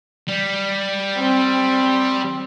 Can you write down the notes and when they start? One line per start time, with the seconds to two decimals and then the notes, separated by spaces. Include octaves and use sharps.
0.28 G3
1.19 C4